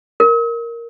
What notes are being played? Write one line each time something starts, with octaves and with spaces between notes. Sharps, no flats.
A#4